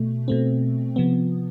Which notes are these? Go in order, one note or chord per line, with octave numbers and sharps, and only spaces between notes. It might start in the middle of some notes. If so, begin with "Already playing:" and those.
Already playing: B2 A3
B2 A3 C4
C3 F3 B3